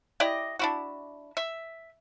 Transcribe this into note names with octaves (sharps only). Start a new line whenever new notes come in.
E4 G4 D5 D#5
D4 E4 F#4
E5